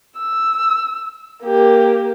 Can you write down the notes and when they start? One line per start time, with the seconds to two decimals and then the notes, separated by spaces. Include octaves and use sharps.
0.19 E6
1.44 A#3 G4